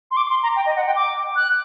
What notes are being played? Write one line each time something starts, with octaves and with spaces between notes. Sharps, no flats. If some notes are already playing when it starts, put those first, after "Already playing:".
C6
D6
C6
A#5
G5
D#5
F#5
G5
D6
F#6